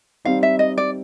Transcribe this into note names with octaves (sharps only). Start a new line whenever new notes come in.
G3 C4 D#4 F5
E5
D#5
D5